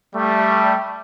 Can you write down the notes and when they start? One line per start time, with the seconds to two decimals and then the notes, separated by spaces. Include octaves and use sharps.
0.15 G3 A3